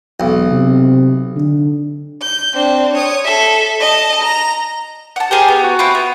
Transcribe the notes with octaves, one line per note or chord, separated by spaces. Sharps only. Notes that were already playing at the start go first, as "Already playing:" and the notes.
E1 B1
C3
D3
G6
C4 D4
C#5 D#6
A4 E5
D#5 A5
A#5
F#5 A5
G4 G#4 A#4 C5
B3
F#4
C4 E4 F4
B3